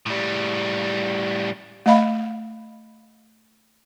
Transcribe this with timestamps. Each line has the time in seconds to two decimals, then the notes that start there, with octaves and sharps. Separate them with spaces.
0.06 A2 G3
1.86 A3 D#5 F5 B5